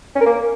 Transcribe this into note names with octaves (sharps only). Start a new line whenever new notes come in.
C#4
A#4
A#3